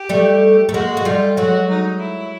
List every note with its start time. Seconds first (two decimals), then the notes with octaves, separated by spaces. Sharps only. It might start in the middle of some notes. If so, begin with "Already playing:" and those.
Already playing: G4
0.09 G3 A3
0.69 A3
0.74 G#3 A#3 F#4
0.97 G#3
1.05 G3 A3 F4
1.37 F#3 G#3 F#4
1.69 D#4
2.02 E4